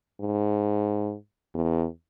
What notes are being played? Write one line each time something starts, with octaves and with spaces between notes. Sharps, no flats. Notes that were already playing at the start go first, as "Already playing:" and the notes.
G#2
E2